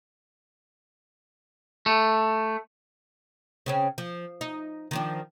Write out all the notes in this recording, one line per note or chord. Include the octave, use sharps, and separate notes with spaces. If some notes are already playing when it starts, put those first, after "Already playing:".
A3
C#3 C4 C#4
F3
D#4
D#3 F3 D4